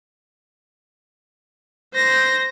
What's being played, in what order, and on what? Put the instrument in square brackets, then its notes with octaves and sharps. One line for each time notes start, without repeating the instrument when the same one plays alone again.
[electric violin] C5 A#6